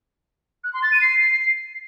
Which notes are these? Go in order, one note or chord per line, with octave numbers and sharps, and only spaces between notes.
F#6
C6
A6
D#7
C7